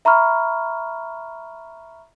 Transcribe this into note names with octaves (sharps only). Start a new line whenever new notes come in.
E5 A#5 B5 C#6 F6